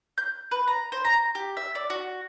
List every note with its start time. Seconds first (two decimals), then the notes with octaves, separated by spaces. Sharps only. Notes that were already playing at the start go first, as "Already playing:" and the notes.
0.18 G6
0.51 B4
0.68 A#5
0.92 C5
1.05 A#5
1.35 G4
1.57 E5
1.75 D5
1.90 F#4